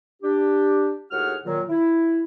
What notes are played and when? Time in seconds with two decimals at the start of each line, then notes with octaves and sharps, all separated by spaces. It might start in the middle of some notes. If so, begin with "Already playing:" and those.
0.22 D4 G4
1.11 D#2 A2 F#4 G#4 F#5 F6
1.46 A#2 D#3 F#3
1.69 E4